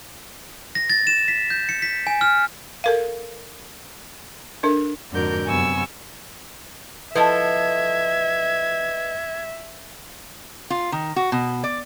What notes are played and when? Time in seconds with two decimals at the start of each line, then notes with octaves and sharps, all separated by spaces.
0.75 A#6
0.90 A6
1.07 E7
1.28 B6
1.50 G6
1.69 C#7
1.82 B6
2.07 G#5
2.21 F6
2.84 A4 A#4 F5
4.63 D4 A4 A#4
5.12 F2 G#2 D3 F#4 A#4 G6
5.47 F#2 C3 B3 G#5 C#6 E6
7.15 F3 E4 A4 B4 D#5 E5 G#6
10.70 F4
10.92 D#3
11.16 F#4
11.32 B2
11.64 D5